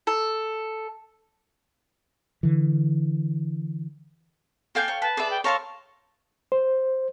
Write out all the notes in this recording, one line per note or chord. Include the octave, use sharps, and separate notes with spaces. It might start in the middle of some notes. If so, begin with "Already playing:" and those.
A4
D3 E3
A#3 A4 F5 G5 G#5 G6
C#5
B4 A5
G#4 B4 D5 E5
G5
A4 A#4 C#5 F5 A5 C6 C#6
C5